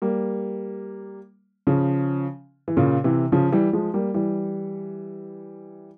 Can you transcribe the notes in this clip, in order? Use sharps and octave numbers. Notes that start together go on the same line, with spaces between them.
G3 A#3
C#3 F3
E3
A#2 C#3
C3 E3
C#3 F3
E3 G3
F3 G#3
G3 A#3
E3 G3